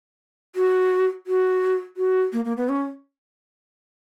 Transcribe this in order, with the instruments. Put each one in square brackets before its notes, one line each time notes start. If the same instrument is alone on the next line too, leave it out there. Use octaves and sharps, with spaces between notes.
[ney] F#4
F#4
F#4
A#3
A#3
B3
C#4